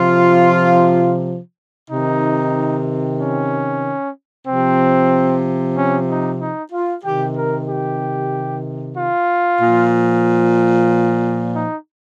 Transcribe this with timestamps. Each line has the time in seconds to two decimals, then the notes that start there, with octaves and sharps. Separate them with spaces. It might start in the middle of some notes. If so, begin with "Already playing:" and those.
Already playing: C3 F3 F4
1.90 C3 D#3 D#4
3.19 C#4
4.47 C3 F3 C4
5.76 C#4
6.08 D#4
6.40 D#4
6.72 F4
7.04 C3 D#3 G4
7.37 A#4
7.69 G4
8.97 F4
9.61 A#2 F3
11.54 D#4